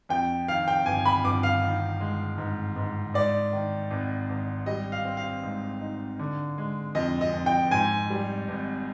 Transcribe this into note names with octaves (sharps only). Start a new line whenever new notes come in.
F2 G5
D#3 F5
G5
G1 G#5
B5
G1 D6
F5
D#3
G#3
G#2
G#2
G#2 D5
D#3
G#1
G#1
G3 D#5
F5
C4
F5
G#2
D#4
D3
G#3
F2 D#5
D#5
F2
G5
G#2 G#5
G3
G#1